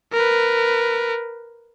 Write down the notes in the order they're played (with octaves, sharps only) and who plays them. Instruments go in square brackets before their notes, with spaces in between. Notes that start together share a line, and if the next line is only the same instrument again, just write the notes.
[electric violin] A#4 B4